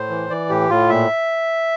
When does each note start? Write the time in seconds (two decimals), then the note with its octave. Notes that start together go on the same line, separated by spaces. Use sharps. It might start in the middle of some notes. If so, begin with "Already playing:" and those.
Already playing: A2 C5
0.10 E3
0.30 E3 D5
0.49 A2 G4
0.69 A2 F4
0.89 A#2 E5